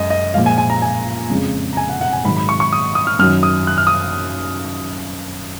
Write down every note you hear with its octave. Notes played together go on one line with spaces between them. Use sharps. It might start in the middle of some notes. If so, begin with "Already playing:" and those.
Already playing: F#2 G#3 D#5
D#5
A#2 F3 G#3 F5
G#5
G#5
A#5
G#5
F2 C#3 G#3
A#5
G#5
F#5
F#5
G#5
G#2 D#3 F#3 B5
B5
C#6
C#6
D#6
D#6
F6
F#2 D#3 F#3 F6
D#6
F#6
F6
D#6